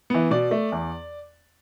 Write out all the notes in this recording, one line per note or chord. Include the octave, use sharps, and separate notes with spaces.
E3 B3
B2 D5
A3
E2